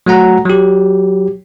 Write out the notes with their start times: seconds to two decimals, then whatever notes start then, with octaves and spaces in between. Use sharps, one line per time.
0.06 F#3 A3 F#4 F#5 A#5
0.45 F#3 G4